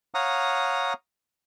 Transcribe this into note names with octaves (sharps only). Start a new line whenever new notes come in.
C#5 F5 F#5 A#5 D#6